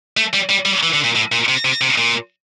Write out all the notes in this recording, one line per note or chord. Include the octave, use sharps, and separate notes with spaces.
A3
G3
G3
G3
E3
D3
A#2
A2
A#2
C3
C3
C3
A#2